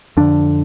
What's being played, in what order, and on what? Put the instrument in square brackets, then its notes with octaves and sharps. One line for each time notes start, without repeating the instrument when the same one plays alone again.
[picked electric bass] F2 D3 D4